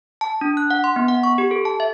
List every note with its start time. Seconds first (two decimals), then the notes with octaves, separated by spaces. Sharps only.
0.21 A5
0.41 D4
0.57 F#6
0.71 F#5
0.84 C6
0.96 B3
1.08 F#5
1.23 C#6
1.38 G4
1.51 A4
1.65 A5
1.80 E5